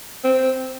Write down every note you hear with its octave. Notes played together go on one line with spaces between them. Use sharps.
C4